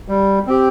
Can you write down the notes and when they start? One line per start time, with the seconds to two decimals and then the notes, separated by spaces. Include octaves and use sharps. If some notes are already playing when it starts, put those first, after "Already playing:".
0.08 G3
0.47 C4 G4